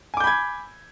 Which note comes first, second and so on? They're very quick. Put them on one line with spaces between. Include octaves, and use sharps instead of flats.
G#5 D6 G6 B5 G#6